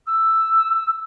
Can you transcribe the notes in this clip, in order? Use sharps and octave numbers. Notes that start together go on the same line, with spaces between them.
E6